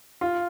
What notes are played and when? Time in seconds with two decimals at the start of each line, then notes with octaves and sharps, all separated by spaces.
0.21 F4